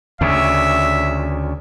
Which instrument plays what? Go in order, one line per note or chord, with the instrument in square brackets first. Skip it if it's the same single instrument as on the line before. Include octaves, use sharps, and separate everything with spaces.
[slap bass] D2 C#3 [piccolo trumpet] E5